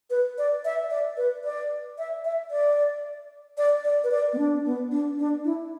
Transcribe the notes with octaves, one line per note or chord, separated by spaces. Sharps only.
B4
D5
E5
D5
B4
D5
E5
E5
D5
D5
D5
B4
D5
B3
D4
B3
D4
D4
E4